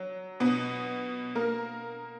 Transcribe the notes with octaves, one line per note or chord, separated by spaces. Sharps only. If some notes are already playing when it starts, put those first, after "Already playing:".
Already playing: F#3
B2 B3
A#3 A#4